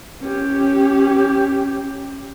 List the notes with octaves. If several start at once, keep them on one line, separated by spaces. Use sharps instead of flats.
C#4 G4